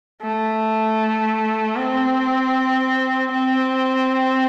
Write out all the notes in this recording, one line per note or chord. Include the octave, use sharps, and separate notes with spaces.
A3
C4
C4